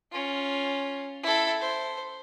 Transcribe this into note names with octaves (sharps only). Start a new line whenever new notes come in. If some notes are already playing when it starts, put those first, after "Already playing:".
C#4 F4
E4 A4
C5